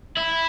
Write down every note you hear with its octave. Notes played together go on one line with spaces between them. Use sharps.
E4